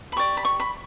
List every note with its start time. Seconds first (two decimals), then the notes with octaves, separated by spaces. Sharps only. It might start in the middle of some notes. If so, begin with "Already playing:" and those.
0.12 B5
0.16 G4 D5 C#6
0.37 B5
0.45 C#6
0.60 B5